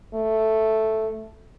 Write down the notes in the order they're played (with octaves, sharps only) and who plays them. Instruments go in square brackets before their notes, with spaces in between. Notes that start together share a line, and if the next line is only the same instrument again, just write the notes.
[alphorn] A3